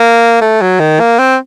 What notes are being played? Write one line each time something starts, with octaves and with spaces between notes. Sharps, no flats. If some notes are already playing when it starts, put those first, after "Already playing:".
Already playing: A#3
A3
F#3
D#3
A#3
C4